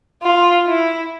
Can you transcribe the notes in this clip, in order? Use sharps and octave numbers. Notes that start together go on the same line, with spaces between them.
F4
E4